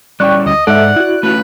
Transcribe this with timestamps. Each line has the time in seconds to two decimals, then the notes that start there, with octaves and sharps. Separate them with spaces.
0.20 G3 C#4 E4 D5 G5 C#6 F#6
0.46 D2 D#5
0.67 G#2 A4 D5 E5 F#5
0.96 E4 F#4 F#6
1.23 A3 C#4 F4 B4